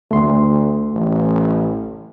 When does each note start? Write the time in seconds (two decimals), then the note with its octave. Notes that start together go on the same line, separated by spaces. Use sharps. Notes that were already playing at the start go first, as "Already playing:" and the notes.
0.11 D2 A3 C6
0.94 A1